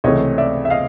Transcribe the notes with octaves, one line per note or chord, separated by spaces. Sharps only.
C#2 C3 E3 A3 C#5 D#5
D5 E5
E5
D#5 F5